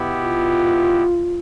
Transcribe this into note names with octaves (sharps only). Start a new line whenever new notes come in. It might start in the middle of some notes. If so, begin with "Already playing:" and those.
Already playing: B2 B3 E4 G4
F4